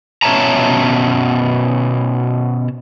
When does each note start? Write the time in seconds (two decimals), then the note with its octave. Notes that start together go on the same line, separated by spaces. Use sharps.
0.23 B2 C#4 C#5 E5 A5 A#5